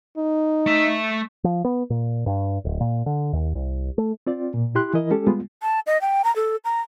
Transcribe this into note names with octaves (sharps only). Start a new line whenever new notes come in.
D#4
A3 E5
F3
B3
A#2
G2
D1
A#2
D3
D#2
C2
A3
C4 F4 D5
A#2
E4 G4 C6 F#6
E3 E4 A#4 D#5
G#3 C#4 G4 A4
G3 G#3 B3 F4
A5
D#5
G5
A#5
A4
A#5